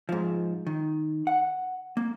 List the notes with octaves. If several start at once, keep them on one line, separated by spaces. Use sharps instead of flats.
G#2 F3
D#3
F#5
A#3